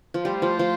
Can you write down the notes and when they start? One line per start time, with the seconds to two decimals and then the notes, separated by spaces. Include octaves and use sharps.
0.14 F3
0.25 G3 A3 F4 C5
0.42 F3
0.59 F3